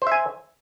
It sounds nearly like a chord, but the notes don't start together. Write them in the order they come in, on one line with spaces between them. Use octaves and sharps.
C5 E5 G#5